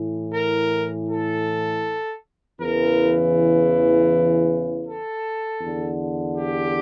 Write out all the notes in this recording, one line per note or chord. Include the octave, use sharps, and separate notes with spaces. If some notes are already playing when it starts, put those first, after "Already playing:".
Already playing: A2 E3
A#4
A4
E2 C#3 E3 A#4
A4
E2 D3
G4